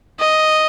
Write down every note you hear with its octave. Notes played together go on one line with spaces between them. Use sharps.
D#5